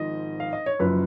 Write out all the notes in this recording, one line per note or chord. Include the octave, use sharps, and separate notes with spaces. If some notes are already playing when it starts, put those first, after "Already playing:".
Already playing: G#1 G#2 F3 D#5
F5
D#5
C#5
F#1 F#2 F3 B4